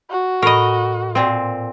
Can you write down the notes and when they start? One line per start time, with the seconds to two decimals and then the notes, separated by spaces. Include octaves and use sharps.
0.10 F#4
0.42 A2 A#4 D#5 B5
1.15 A#2 C4